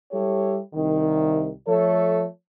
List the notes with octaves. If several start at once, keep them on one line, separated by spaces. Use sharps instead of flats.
G3 E4 G4 A4 C#5
C2 D#3
F3 A3 A4 C#5